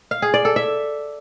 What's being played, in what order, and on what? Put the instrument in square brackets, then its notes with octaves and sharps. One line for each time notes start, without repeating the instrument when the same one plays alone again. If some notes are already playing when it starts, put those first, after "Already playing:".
[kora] F5
G#4
D5
A4
E5